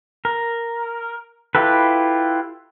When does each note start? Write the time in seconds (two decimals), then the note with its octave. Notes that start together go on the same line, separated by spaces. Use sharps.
0.25 A#4
1.55 E4 F4 G4 A4 B4